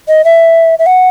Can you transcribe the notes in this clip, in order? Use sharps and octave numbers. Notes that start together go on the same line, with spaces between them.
D#5
E5
E5
F#5